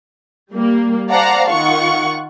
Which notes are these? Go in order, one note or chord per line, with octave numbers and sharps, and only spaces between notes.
G3 A#3
C5 D5 F5 F#5 A5 A#5
D#3 F4 F#5 C#6